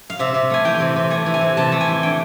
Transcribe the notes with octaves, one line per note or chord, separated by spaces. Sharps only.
F5
C3 E5
C3
A3 G#5
E3 G5
C3
C3
A3 G#5
E3
G#5
C3
C3 A5
A3
G#5
E3
D3 G5